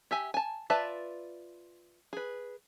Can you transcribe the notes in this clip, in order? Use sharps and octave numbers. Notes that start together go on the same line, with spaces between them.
G4 E5 G#5
G#5 A5
F4 B4 D5 E5 A5
G#4 B4